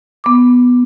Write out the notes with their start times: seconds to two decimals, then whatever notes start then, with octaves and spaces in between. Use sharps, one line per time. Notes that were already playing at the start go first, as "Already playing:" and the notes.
0.24 B3 D6